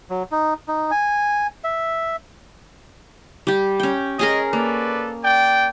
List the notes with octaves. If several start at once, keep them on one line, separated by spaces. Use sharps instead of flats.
F#3
D#4
D#4
G#5
E5
G3 G4
C#4 G5
G#3 C#4 G#4 A#4 D#5
A#3 A4 B4 D5
D5 G5